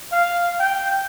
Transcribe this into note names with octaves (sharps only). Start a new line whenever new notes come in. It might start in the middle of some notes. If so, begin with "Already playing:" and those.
F5
G5